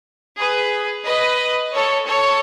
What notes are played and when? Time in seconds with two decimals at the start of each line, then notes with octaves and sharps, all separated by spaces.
0.38 G#4 B4
1.05 B4 D#5
1.73 A4 C#5
2.06 A4 C#5